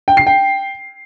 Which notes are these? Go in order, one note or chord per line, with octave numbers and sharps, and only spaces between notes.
G5
C7
G5